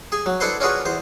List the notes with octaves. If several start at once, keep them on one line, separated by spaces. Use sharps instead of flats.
G#4 G#5
F#3
D4 E4 A4 B4 C5 C6
C#4 D4 F4 F#4 G#4 B4
E2 C5